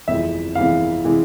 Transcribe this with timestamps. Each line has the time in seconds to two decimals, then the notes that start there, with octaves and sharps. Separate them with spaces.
0.08 G1 F2 C3 E3 G#3 E5
0.55 G1 F2 C3 E3 G#3 F5
1.04 C3 E3 G#3